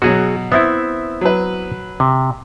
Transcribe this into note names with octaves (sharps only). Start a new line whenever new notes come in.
B2 F#3 F#4 G#4
B3 C4 E4 E5
F#3 B4
C3